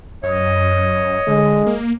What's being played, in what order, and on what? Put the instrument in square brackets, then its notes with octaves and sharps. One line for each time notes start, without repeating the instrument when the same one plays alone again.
[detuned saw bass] F#2 [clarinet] C#5 [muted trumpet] D#5
[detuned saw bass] D3 [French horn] G#3
[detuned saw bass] A#3